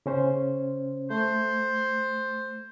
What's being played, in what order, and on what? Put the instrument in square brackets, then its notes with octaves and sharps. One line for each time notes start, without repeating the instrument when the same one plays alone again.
[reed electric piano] C#3 C#4 C5
[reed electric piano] A3 [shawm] C5